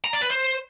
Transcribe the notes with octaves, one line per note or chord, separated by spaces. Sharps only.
A#5
D5
B4
C5